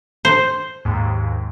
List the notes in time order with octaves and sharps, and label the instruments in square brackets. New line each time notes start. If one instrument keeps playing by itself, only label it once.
[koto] C5
[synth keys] D#2 G#2